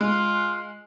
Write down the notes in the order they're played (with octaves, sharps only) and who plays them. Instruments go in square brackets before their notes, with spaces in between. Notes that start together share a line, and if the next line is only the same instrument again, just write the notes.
[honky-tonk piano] G#3 [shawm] F4